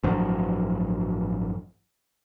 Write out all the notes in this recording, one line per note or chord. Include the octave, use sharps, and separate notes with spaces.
A1 G2 F3 F#3